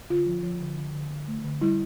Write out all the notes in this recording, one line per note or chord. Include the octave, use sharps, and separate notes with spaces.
D3 F4
F3
F3
D3
D3
D3
D3
A3
D3
G3 E4